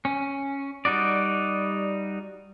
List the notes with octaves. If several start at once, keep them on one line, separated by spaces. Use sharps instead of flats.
C#4
G3 D#4 F#4 D5